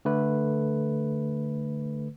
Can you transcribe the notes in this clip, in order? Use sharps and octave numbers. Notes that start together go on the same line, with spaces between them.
D3 A3 B4